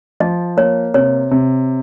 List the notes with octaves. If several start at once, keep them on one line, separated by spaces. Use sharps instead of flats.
F3 D#5
A#3 C#5
C3 C#5
C3